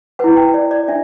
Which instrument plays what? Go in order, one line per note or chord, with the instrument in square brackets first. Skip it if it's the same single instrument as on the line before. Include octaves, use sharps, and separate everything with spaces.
[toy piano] E4 B4 F#5
G5
D5
D5
D4 E5